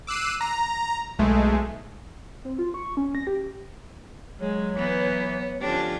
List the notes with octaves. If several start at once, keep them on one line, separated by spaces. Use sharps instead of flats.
D6 E6 F#6 C7 D#7
A#5
B1 G#3 A3
C4
F4
C#6
C#4
A#6
G4
F#3 G#3 C#5
E3 B3
D3 F3 C#4 D4 G4